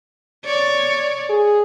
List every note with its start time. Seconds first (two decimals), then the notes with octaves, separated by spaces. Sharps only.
0.45 C#5 D5
1.29 G#4